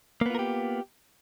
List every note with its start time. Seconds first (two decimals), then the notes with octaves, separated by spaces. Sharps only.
0.21 A#3
0.26 B3
0.30 F4
0.35 A#4
0.39 G4